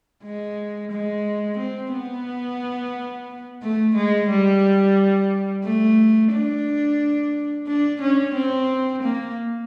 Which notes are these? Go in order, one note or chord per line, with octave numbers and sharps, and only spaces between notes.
G#3
G#3
C4
B3
A3
G#3
G3
A3
D4
D4
C#4
C4
A#3